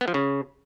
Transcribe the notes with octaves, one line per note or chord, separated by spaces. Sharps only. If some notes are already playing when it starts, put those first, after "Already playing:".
B3
F3
C#3